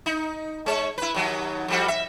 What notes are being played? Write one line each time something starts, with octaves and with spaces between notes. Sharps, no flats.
D#4
G#3 C#5
E4 B4
D#2 F#3
F2 G3 F#4
E5